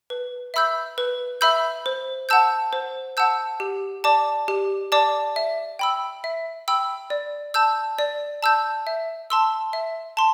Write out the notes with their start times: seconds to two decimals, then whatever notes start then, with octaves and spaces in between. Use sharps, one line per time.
0.10 B4
0.54 E5 B5 E6 G6
0.98 B4
1.41 E5 B5 E6 G6
1.86 C5
2.29 F#5 A5 E6 G6
2.73 C5
3.17 F#5 A5 E6 G6
3.60 G4
4.04 D5 A5 D6
4.48 G4
4.92 D5 A5 D6
5.36 E5
5.79 G5 B5 E6
6.24 E5
6.68 G5 B5 E6
7.10 D5
7.54 A5 E6 G6
7.99 D5
8.43 A5 E6 G6
8.87 E5
9.30 A5 C6 E6
9.73 E5
10.17 A5 C6